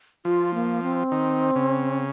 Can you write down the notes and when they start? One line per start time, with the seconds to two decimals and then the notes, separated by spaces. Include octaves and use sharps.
0.25 F3 F4
0.54 A#3
0.83 C4
1.12 D#3
1.56 C#3